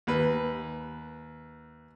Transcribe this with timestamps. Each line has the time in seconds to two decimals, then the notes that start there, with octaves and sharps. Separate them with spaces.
0.07 D#2 B4